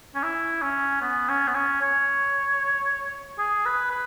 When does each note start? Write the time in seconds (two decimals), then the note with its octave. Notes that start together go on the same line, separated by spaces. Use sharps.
0.15 C#4
0.23 E4
0.62 C#4
1.01 B3
1.28 C#4
1.47 B3
1.54 C#4
1.81 C#5
3.38 G#4
3.65 B4
3.91 B4